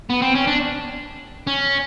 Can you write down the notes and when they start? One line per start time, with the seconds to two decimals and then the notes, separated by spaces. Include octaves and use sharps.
0.10 B3
0.22 C4
0.35 C#4
0.47 D4
1.47 C#4